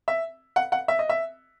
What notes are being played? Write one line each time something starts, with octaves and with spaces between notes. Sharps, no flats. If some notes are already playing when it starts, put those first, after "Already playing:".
E5
F#5
F#5
E5
D#5
E5